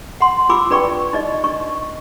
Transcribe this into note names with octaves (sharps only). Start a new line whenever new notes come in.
F#5 C6
F4 G#5 B5 D6 E6
D4 B4 D5 G5 C#6
D#4 D5 D#5
D4 C#6